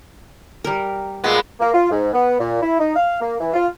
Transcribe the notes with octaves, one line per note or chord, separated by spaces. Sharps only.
G3 A#4
A#2 G#3 B3
A#3
F4
G#2
B3
A#2
E4
D#4
F5
A#3
E3
F4